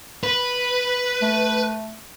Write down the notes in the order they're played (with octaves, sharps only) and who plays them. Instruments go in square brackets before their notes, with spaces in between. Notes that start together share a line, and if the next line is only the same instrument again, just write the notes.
[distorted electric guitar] B4
[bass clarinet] A3